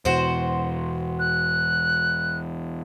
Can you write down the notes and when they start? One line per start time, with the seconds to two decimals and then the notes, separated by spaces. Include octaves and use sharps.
0.05 E2 B2 E3 F#4 C5
1.19 F#6